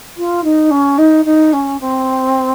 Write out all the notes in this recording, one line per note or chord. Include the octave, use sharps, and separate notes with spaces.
F4
D#4
C#4
D#4
D#4
C#4
C4